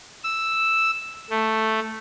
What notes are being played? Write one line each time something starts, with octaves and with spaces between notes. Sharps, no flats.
E6
A3